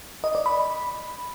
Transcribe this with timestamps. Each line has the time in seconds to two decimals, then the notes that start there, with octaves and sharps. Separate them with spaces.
0.24 D#5
0.35 D5
0.46 B5